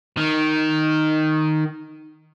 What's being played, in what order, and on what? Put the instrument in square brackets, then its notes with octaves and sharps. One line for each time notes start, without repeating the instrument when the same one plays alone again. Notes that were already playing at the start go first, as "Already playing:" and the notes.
[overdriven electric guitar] D#3